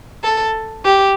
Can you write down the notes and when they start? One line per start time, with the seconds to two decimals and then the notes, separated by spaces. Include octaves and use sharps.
0.23 A4
0.85 G4